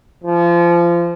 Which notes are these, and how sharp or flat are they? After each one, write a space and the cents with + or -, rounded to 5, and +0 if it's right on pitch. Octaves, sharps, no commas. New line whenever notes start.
F3 -25